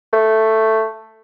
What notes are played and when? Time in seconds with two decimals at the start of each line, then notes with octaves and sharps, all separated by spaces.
0.13 A3